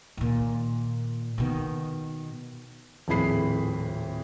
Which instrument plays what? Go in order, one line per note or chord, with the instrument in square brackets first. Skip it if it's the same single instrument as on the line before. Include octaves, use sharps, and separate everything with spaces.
[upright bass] A#2 D#3
B2 D#3
[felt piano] D#1 F2 A2 G#4 B5 C7